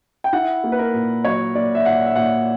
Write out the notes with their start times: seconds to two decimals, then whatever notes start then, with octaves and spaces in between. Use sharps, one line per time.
0.24 G5
0.33 E4 F#5
0.64 A#3
0.72 B4
0.79 A#4
0.94 A#2
1.24 F#3 C#5
1.55 A#3 D5
1.75 E5
1.85 A#2 F#5
2.06 E5
2.15 A#2 F#5